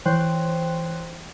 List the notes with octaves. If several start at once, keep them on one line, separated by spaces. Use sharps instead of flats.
E3 C5 C#5 G5 C6 F#6